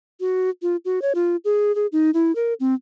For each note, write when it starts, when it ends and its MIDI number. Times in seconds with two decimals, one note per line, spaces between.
0.20 0.50 66
0.62 0.76 65
0.85 1.02 66
1.02 1.13 73
1.15 1.36 65
1.45 1.74 68
1.75 1.87 68
1.92 2.11 63
2.14 2.34 64
2.36 2.54 70
2.60 2.74 60